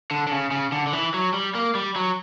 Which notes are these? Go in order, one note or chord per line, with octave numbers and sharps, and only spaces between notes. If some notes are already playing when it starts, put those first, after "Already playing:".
D3
D3
C#3
C#3
D3
D3
E3
F#3
G3
A#3
G3
F#3